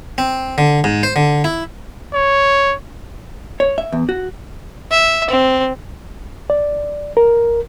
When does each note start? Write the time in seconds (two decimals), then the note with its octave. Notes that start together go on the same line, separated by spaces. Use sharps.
0.18 C4
0.58 D3
0.84 G#2
1.03 C5
1.16 D3
1.44 E4
2.14 C#5
3.60 C#5
3.78 E5
3.92 E2
4.09 F#4
4.91 E5
5.30 C4
6.50 D5
7.17 A#4